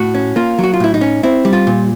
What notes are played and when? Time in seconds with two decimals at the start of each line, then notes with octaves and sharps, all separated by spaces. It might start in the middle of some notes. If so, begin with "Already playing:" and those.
Already playing: A2 F#4
0.14 C#4
0.36 A#3 F4
0.58 F#3
0.64 F#4
0.74 F4
0.80 A2 E4
0.94 D#4
1.01 C#4
1.23 C4 E4
1.45 G3
1.53 F4
1.67 A#2